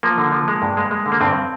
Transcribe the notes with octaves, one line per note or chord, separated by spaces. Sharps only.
F3 A#3
D3
F3
G#3
G2
G#3
G#3
D3
A#3
G2 C4